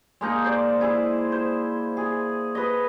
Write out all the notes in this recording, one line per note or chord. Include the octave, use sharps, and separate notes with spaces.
G#3 A#3 D#4
C5 D5
E4 G#4 E5
C5
G#4
B4 D#5